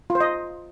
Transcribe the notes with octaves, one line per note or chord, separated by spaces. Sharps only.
F4
C5
D#5